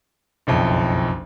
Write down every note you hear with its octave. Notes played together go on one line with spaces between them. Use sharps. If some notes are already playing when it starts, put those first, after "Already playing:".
F#1 B1 F2